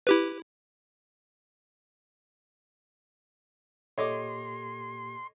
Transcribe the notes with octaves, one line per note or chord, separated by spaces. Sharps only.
E4 G4 B4
A#2 A#3 G4 A4 C#5 D#5 C6 D6